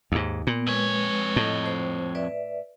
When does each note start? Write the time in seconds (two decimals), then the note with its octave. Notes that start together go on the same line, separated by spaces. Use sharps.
0.12 D#2 G#2
0.47 A#2 B3
0.67 F2 G#3 B4 C#5
1.36 A2 D#5 A5
1.66 C5
2.15 B4 D5 E5